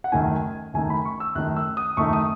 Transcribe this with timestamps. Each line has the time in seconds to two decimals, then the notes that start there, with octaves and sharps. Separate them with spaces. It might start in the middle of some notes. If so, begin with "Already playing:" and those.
0.04 F#5
0.12 F#2 D#3 A3 D#4 G#5
0.74 F#2 D#3 A3 D#4 G#5
0.90 B5
1.05 C#6
1.20 E6
1.35 F#2 D#3 A3 D#4 F#6
1.56 E6
1.77 D#6
1.97 F#2 D#3 A3 D#4 C#6
2.13 D#6